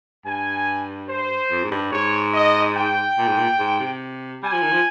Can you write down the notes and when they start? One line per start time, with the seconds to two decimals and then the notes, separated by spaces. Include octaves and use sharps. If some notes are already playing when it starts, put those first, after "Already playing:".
0.24 G2 G#5
1.09 C5
1.50 F2
1.63 G#2
1.71 G2
1.91 G#2 C#5
2.34 D#5
2.75 G5
3.18 A#2
3.28 G#2
3.38 A#2
3.59 G#2
3.80 C3
4.42 G3 G#5
4.52 F3
4.62 D#3
4.72 F3